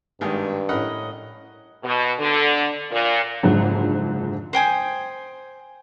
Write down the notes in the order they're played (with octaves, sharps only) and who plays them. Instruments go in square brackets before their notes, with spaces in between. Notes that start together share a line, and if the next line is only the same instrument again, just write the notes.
[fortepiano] G#1 D#3 G#4 [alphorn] G2
[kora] A2 C#4 [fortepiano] A#4 F#5 B5 [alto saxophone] D#5
[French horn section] B2
D3
A#2
[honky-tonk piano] F#1 G#2 D3 F3 F#3
[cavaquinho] C5 G5 G#5 D#6